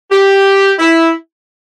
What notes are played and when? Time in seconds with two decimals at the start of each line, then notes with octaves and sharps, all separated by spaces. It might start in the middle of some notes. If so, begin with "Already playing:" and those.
0.11 G4
0.79 E4